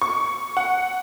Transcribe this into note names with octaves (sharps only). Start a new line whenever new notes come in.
C#6
F#5